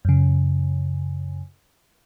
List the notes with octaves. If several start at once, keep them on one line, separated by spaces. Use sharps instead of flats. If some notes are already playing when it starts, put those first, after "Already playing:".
F#2 C#3